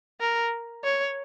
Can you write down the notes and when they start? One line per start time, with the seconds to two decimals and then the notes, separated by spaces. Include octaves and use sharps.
0.20 A#4
0.84 C#5